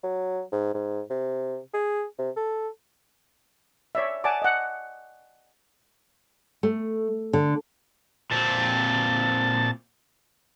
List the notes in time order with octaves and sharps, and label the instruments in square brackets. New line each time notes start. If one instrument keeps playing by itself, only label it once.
[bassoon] F#3
G#2
G#2
C3
G#4
C3
A4
[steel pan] C#5 D5 E5
D5 F#5 G#5 A5 D6
D#5 F#5
[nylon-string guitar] A3
D3
[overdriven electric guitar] A#2 C4 [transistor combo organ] A5